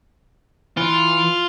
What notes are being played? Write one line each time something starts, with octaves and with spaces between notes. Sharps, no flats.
E3 F4